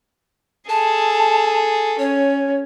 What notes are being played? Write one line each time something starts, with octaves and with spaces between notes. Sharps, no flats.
G#4 A4 A5
C#4 C#5